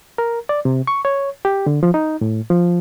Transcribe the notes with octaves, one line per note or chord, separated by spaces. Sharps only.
A#4
D5
C3
C#6
C#5
G4
D3
F3
D#4
A2
F3